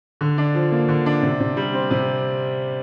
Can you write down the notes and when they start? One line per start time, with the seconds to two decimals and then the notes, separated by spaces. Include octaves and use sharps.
0.21 D3
0.38 D4
0.55 F3
0.72 A#3
0.89 D3
1.06 D4
1.23 C3
1.40 C3
1.57 G3
1.73 C4
1.91 C3